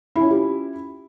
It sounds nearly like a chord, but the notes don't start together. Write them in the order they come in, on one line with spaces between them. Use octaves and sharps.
E4 C#4 F4 G4